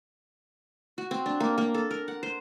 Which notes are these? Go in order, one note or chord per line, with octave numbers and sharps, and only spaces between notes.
F#4
C4
D4
A#3
A#3
A4
A#4
F#5
C5